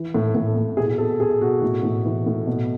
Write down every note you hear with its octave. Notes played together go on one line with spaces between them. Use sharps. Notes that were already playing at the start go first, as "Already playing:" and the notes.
Already playing: E3
A2
A2
A2
B2 G#4
B2 A4
B2 G#4
B2 F#4
A2
A2
E3
A2
B2